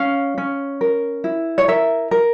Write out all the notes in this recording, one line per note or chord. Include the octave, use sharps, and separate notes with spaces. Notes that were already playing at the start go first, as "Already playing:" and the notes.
Already playing: C#4 F5
C#4
A#4
E4
C#5
A#4 E5
A#4